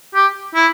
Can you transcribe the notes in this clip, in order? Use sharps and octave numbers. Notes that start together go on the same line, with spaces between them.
G4
E4